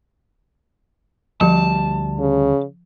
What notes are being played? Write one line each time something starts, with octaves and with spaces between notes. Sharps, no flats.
D2 F3 G3 A5
C#3